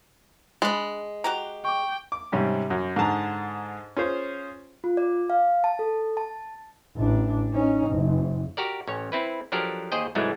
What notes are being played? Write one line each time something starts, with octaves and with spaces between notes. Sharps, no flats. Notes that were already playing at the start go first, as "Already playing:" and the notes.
G#3 D4 B5
F#4 G4 A#5
G5 C#6 D6
D6
G#2 C3 G3 C#4 G4
F#2 F#3
G#2 D3 G#4 A5 A#5
C#4 F4 G#4 C5
F4
D5
F5
A5
A4
A5
A1 D4
C#4 D#4
F#1
F#4 G4 A#4 D5
A1 C#4 C#5
C4 E4 B4
F3 F#3 D4 G4 A4 A#4
D#2 G#4 C5 D#5 G5
C2 G#2 E3 F#3 G#3 A3